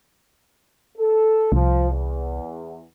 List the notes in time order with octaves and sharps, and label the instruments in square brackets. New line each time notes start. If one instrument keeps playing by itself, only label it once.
[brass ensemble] A4
[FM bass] C2 [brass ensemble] F3
[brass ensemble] E2